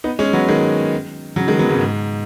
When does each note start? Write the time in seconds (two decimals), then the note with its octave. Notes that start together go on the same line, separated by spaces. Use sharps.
0.04 B3 D#4
0.19 G#3 C#4
0.33 F#3 B3
0.49 D#3 G#3
1.36 C#3 F#3
1.48 D#3 G#3
1.59 F#3 B3
1.69 G#2 C#3
1.81 G#2